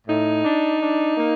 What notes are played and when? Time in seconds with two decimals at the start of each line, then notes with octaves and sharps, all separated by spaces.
0.07 A2 D#4
0.44 D4
0.80 D4
1.17 A#3